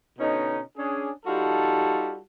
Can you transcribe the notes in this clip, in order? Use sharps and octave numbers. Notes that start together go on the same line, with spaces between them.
B2 D3 C#4 D#4
C#4 D4 G#4
G3 D#4 F4 F#4 A4 A5